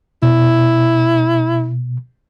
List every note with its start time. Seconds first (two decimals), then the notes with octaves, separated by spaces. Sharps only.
0.23 B2 E4